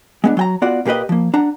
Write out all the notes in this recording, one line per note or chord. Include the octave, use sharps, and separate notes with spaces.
G#3 B3 D4
F#3 G5 A#5
B3 F4 F#4 D5 F#5
A#2 A#3 G4 B4 D#5
F3 A#3
D4 F#5 A#5